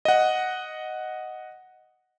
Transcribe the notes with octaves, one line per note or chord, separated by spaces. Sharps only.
D#5 F#5